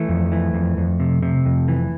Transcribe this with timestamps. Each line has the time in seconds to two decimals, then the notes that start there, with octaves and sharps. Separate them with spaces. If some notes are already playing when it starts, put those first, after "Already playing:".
Already playing: E3 A3
0.08 F2
0.32 E3
0.54 F2
0.77 F2
1.00 C3
1.22 C3
1.45 F2
1.68 E3